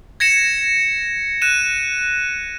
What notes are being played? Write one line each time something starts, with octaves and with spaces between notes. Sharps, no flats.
G#6 A#6 C#7 E7
F#6 D#7 E7